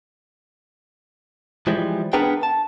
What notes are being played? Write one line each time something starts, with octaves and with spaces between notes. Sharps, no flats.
E3 F3 G3 G#3
B3 D4 G#4 A#4 B4 G5
A5